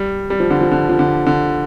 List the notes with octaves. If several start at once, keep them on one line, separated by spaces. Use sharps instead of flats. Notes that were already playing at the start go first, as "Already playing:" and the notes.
Already playing: G3
G3
F3
D3
F3
D3
F3
D3
D3